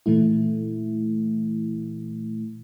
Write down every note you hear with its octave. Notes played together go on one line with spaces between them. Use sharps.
A#2 E3 A3 E4